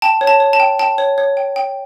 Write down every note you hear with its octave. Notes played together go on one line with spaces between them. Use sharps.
G5 A5
C#5
A5
C#5
A5
G5
G5 A5
C#5
C#5
G5
G5